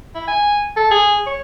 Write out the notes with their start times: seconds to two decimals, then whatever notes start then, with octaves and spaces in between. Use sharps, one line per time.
0.15 E4
0.28 G#5
0.76 A4
0.91 G#4
1.26 C#5